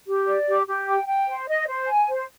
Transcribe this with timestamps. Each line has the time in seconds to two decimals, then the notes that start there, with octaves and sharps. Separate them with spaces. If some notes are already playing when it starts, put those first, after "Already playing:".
0.07 G4
0.27 D5
0.47 G4
0.67 G4
0.87 G5
1.08 G5
1.27 C5
1.48 D#5
1.68 C5
1.87 G#5
2.08 C5